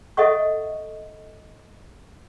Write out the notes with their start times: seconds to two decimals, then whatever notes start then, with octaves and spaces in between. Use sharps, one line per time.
0.17 A4 D#5 E5 F#5 C#6